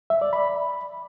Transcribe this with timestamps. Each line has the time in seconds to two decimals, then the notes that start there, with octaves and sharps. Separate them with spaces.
0.10 E5
0.21 D5
0.33 B5